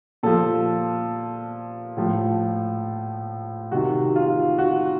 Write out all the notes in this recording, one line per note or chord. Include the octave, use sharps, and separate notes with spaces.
A#2 F3 A4
A2 F3
C3 D#3 F#4
F4
F#4